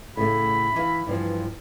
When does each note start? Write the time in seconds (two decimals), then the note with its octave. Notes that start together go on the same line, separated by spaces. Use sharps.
0.17 A2 C#3 A3 B5
0.76 E3 F5
1.07 G2 E3 F3